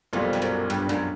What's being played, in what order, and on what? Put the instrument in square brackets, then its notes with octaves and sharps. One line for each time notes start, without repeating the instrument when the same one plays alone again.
[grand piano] B1 A#2 G3 [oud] F2
[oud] F2
F#2
G2
F#2